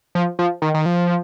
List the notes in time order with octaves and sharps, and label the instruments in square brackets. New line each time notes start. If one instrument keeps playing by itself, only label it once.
[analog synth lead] F3
F3
D#3
D#3
F3